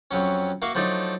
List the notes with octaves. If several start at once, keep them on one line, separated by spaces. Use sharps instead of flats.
F2 F#3 C#4
A#3 F#4 E5 F5
F3 F#3 A3 D4 D#4